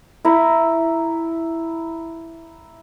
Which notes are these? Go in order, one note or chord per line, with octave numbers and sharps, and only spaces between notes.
E4 A#5 B5